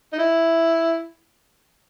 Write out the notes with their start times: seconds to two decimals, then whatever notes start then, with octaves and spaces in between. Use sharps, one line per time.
0.13 D#4
0.18 E4